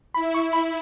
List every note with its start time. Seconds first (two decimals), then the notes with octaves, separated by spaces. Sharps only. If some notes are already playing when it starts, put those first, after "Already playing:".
0.14 E4 B5
0.34 C#6
0.53 B5